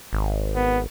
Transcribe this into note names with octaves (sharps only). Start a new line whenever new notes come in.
G#1
B3